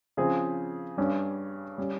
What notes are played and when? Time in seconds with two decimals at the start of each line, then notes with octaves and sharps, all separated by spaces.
0.17 C#3 F3 C4 G#4
0.97 G2 G3 C#4
1.78 G3 C#4